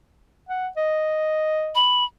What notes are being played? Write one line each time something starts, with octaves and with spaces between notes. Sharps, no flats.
F#5
D#5
B5